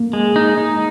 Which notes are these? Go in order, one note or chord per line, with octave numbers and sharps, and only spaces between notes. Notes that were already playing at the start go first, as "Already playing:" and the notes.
Already playing: A#3
G#3
D#4
D#4